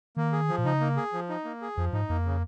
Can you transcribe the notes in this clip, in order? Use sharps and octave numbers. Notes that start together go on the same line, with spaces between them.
D#3 A#3
G#4
F3
A#2
C#3 D#4
A#3
G#4
F3
D#4
A#3
G#4
F2 F3
G#2 D#4
F2 A#3
C#3